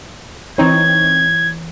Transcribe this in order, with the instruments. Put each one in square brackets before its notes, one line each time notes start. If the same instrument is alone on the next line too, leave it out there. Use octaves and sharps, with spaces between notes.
[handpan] E3 C#5 [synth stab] C4 D#4 [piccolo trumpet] G#6